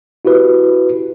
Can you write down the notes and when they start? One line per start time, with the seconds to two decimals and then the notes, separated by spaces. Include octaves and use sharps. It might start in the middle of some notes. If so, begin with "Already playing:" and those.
0.25 E4 F#4 G4 B4